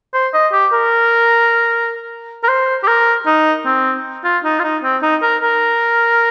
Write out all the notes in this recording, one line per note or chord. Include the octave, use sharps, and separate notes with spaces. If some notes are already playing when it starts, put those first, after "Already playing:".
C5
D#5
G4
A#4
A#4
C5
G4
A#4
D#4
C4
F4
D#4
F4
D#4
C4
D#4
A#4
A#4